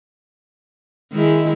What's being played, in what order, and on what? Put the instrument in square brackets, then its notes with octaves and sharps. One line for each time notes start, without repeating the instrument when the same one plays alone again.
[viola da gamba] D#3 E4 [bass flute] G#3